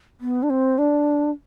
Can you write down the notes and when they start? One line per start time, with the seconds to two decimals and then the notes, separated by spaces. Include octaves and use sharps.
0.21 B3
0.43 D4
0.50 C4
0.78 D4